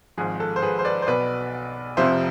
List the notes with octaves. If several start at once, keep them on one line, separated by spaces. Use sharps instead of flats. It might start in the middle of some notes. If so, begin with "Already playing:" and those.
G#1 G#2 F3 G#4
A4
C5
G#4 B4
C5
B4 D5
C5
B1 B2 B4 D5
F1 F2 C3 F3 C5 E5